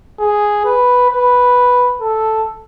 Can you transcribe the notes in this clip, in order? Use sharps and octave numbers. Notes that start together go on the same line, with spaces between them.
G#4
B4
B4
A4